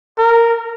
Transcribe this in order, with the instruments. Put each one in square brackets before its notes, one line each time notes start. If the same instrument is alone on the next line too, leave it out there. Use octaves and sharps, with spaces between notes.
[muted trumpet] A#4